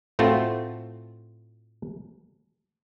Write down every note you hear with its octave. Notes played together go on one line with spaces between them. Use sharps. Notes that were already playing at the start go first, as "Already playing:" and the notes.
A2 A3 C4 F4 F#4 A5